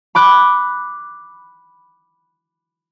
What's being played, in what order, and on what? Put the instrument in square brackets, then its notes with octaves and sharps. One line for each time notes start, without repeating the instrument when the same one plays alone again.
[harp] B5 D6 F#6